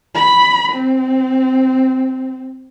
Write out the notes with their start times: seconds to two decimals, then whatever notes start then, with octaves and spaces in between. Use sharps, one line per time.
0.15 B5
0.72 C4